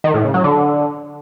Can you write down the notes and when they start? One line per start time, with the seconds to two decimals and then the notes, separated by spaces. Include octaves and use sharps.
0.04 D#3
0.14 A2
0.24 C#3
0.34 F#3
0.44 D3